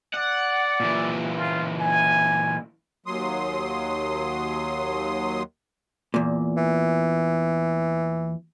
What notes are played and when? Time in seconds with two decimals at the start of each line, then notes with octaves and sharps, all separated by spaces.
0.14 D5 F#5
0.80 A#2 E3
1.38 F4
1.81 G#5
3.06 D#2 F#3 C6 D#6
6.14 E2 A#2
6.57 E3